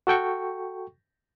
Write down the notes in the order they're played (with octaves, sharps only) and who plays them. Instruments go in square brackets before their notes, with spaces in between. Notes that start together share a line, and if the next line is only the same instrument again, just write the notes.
[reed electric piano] F#4 A4 G5 C#6